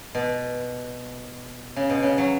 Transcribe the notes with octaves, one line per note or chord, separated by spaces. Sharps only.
B2
C#3
B2
C#3
F#3